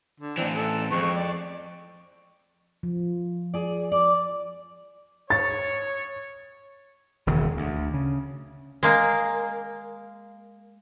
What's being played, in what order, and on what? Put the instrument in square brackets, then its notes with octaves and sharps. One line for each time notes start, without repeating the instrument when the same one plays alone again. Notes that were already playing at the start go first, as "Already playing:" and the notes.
[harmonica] D3
[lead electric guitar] A2 E3 [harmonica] C4 D4
[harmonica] A4
[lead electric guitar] F2 [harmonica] G#3 C4 C#6
[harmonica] D5
[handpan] F3
[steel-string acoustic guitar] G#4 D5
[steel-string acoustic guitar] D5 [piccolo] D6
[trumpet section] C#5 [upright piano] A6
[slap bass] E1 D#2 C#3
D2
C#3
[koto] G#3 A#3